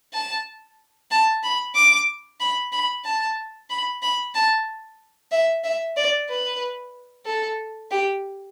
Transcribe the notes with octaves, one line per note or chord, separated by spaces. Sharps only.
A5
A5
B5
D6
B5
B5
A5
B5
B5
A5
E5
E5
D5
B4
A4
G4